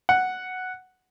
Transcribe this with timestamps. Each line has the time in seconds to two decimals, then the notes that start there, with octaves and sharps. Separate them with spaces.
0.09 F#5